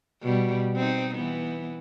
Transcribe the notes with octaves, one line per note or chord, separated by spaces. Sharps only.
B2 G3
C4 D#4
E3 B3